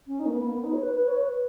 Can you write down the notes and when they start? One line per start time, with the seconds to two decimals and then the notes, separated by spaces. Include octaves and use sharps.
0.07 C#4
0.19 D#4
0.26 A#3
0.32 B3
0.44 A#3
0.54 B3
0.64 D#4
0.73 C#5
0.83 B4
0.96 B4
1.08 C#5
1.21 B4